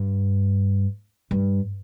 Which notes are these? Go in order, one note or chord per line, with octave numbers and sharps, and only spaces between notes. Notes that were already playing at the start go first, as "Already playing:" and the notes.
Already playing: G2
G2